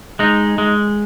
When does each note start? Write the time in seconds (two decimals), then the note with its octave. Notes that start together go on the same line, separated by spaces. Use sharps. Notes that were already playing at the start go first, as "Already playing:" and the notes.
0.19 G#3 D#4
0.58 G#3